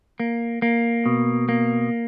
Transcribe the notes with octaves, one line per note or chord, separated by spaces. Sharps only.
A#3
A#3
B2
A#3